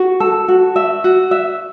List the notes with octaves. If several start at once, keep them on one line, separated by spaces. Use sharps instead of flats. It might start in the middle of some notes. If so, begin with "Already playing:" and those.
Already playing: F#4
A4
F#4
E5
F#4
E5